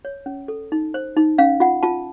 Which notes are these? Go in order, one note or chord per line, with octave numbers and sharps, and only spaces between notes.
C#5
C#4
A4
D#4
C5
D#4
C#4 F5
F4 F#5
F4 A5